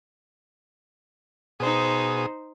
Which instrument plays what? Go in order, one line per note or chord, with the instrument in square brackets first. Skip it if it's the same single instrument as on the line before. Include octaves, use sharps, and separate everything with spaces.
[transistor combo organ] B2 G#4 D#6 [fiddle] D#4 C5